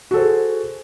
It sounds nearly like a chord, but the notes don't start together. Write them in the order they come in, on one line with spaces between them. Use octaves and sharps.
F#4 A4 C5 G#4